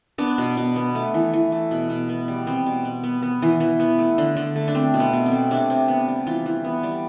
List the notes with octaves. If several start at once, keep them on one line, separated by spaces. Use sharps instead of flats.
B3 D4
B2
B2
B3
A3
E3
E3
A3
B2
B2
B3
G3
B3 C4
B2
B2
B3
B3
E3
E3
B3
A3
D3
D3
A3
D4
A3 C4
B2
B3
B2
C4
A3
C3 D4
C3
B3
G3
E3 F4
E3
B3
G3